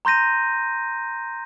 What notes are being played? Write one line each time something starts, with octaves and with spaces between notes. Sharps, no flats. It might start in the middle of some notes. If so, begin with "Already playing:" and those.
A#5 C6 G6 A#6 D#7